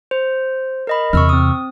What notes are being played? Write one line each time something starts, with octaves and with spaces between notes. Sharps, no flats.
C5
A#4 D#5 B5
E2 C3 C#6 E6 F6
C4 D#6